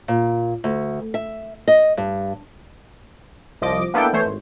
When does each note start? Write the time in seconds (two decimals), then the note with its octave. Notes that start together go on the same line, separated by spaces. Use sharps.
0.08 A#2
0.64 D2
1.14 E5
1.68 D#5
1.97 G2
3.62 C2 F3 D#5 D6
3.94 A#3 B3 D4 E4 A4 G5
4.13 E3 A3 C5 C#5
4.25 G#1